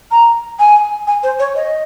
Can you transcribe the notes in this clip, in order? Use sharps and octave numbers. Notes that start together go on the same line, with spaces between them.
A#5
G#5
G#5
C5
C#5
D#5